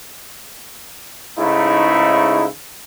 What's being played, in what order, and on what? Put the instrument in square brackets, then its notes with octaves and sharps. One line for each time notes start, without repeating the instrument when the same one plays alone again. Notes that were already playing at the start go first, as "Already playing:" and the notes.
[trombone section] C#2 G#2 C#3 A3 D#4 E4